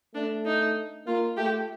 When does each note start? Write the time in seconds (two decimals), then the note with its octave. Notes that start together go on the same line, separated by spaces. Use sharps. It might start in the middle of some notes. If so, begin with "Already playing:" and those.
0.14 A3 D4
0.45 D#4
1.07 A#3 F4
1.37 A3 G4